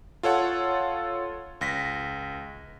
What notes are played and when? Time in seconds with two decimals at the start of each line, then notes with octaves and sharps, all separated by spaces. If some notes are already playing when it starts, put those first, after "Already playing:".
0.23 F4 A4 C#5 F#5
1.61 C#2 A#6 B6